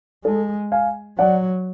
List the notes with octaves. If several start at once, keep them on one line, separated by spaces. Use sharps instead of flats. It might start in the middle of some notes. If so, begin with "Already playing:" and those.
G#3 A4
F5 G#5
F#3 D5 F#5